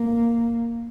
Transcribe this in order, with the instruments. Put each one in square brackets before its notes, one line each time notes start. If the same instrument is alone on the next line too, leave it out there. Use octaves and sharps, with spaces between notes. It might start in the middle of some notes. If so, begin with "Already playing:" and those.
Already playing: [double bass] A#3